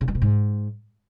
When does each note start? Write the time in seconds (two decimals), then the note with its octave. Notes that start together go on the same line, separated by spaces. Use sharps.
0.01 C#3
0.08 G2
0.15 B2
0.22 G#2